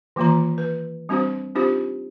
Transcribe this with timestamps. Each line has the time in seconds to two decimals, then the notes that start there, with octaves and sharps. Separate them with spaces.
0.16 D#3 E3 A#3 F4 A#5
0.58 B4
1.09 G3 C4 D4 F#4 C5
1.55 C4 D4 D#4 F4 G4 C5